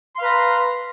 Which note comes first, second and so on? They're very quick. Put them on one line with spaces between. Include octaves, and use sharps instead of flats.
C6 F5 B4 A#5